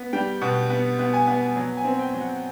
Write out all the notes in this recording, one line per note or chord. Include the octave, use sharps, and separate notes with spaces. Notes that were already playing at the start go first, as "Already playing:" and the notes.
Already playing: B3
G3 G5
B2 F#5
B3
B3
G#5
B3
F#3
G#5
C4
G5
F#3
F#5